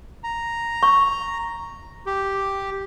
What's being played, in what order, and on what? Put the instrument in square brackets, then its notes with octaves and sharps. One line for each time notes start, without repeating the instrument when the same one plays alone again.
[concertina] A#5
[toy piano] C#6
[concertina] G4